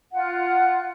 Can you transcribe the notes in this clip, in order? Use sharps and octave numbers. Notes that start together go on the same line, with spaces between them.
F4 F#5